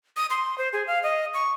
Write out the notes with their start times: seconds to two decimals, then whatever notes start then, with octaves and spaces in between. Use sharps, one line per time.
0.16 D#6
0.30 C6
0.58 C5
0.73 G#4
0.87 F5
1.03 D#5
1.34 C#6